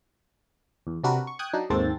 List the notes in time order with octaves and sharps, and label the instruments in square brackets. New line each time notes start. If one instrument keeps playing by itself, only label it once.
[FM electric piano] E2
C3 D4 F#4 A#4 B4
C#6
G5 D#6 F#6 G#6
F#3 D4 D#4
D#2 G#2 A#3 C4 A4 A6